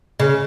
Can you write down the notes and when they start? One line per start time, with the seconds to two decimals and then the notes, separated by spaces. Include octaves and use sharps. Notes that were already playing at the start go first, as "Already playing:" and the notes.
0.20 C#3